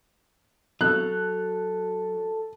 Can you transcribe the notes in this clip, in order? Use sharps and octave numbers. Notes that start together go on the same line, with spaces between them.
F#3 A4 F#6